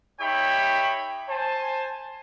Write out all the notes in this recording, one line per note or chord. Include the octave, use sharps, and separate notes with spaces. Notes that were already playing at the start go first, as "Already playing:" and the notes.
D#4 G4 C#5 E5 G5 B5
C5 G#5 A5